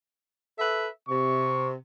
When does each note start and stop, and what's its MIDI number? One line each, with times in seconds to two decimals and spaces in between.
0.58 0.88 69
0.58 0.88 71
0.58 0.88 76
1.08 1.74 48
1.08 1.69 85